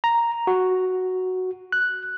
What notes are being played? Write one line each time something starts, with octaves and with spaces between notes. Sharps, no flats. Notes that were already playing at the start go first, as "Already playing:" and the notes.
A#5
F#4
F#6